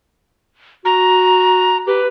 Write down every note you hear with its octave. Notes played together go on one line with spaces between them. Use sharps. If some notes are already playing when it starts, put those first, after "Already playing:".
F#4 A#5
G4 B4